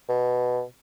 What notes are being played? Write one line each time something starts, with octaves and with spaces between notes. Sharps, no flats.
B2